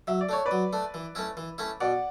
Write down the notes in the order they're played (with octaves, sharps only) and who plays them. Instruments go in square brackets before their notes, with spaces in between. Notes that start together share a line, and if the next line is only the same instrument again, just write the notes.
[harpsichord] F#3 [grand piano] E5
[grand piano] D5
[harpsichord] A3 D4 [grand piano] C#5
[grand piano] B4 D5
[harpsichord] F#3
A3 D4
E3
A3 C#4 E4
E3
A3 C#4 E4
[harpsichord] B2 [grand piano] D5 F#5